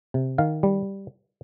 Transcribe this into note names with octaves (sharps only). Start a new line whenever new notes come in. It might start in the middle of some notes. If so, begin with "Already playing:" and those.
C3
D#3 F5
G3